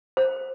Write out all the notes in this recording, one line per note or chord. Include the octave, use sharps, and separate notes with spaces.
C5